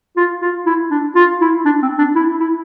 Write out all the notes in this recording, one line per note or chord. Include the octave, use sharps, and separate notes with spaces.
F4
F4
E4
D4
F4
E4
D4
C4
D4
E4
E4